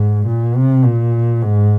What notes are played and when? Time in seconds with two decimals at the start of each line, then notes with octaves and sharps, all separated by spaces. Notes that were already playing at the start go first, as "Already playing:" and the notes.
Already playing: G#2
0.26 A#2
0.55 C3
0.84 A#2
1.42 G#2